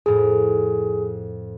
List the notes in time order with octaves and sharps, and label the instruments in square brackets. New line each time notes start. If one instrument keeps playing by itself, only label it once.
[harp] F2 A2 [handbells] G#4